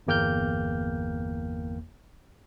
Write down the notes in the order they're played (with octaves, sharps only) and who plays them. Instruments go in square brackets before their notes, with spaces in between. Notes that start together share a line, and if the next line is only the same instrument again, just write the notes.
[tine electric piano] G1 E2 A#3 G5 F6 G6